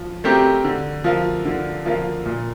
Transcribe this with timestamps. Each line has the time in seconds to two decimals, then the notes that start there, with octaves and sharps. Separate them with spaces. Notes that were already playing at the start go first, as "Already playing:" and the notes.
Already playing: F3
0.24 A3 C4 G4 A#4
0.65 D3
1.04 F3 A#3 F4
1.45 D3
1.85 F3 A#3 F4
2.26 A#2